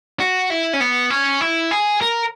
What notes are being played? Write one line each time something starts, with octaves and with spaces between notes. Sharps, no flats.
F#4
E4
C#4
B3
C#4
E4
G#4
A#4